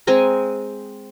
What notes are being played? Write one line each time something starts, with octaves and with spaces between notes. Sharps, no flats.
G#3 C4 G#5 A#5